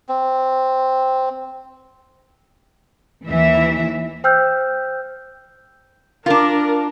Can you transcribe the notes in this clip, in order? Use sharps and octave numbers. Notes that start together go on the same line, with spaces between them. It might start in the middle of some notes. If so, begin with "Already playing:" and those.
C4
D#2 E3 E5
C5 G5 E6 F6 G6
D4 F4 A#4